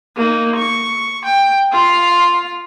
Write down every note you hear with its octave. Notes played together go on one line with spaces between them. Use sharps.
A#3 D#4
C#6
G5
F4 F5